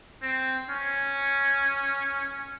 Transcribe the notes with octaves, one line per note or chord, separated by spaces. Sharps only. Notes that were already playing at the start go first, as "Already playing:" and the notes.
C4
C#4